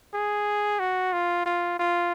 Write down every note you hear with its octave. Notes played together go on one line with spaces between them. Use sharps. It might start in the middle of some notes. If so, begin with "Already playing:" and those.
G#4
F#4
F4
F4
F4